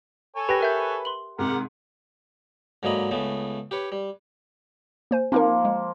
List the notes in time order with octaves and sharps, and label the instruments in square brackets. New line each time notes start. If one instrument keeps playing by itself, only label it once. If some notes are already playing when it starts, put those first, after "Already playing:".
[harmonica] A4 C#5 G#5
[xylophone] G4 G5 A#6 [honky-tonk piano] B4
[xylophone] A#4 E5 G6
C6 F#7
[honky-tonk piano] G#2 C3 [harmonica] G4 A#4 F#5
[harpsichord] G#2 D3 F#3 A#3 D#5 B5
C#2 C#3 A3 B3
G4 B4 C#5
G3
[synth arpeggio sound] A#3 C5 G#5
[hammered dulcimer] F3 A#3 [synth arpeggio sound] C4 D#4 A#4
[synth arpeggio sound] G#3